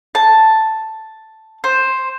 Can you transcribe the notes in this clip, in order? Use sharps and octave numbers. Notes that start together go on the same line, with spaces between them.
A5
C5